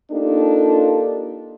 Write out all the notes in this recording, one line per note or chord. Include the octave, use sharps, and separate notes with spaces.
A#3 D4 D#4 F4 G4 A4